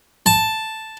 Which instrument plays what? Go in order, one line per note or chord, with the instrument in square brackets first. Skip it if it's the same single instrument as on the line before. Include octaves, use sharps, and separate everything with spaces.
[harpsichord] A5